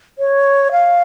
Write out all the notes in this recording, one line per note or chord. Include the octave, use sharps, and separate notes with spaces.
C#5
F5